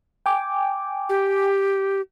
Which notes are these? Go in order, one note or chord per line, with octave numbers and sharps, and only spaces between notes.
G5 G#5 D6
G4